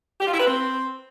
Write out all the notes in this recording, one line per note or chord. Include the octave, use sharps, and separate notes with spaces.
G4
F4
E4
B4
C4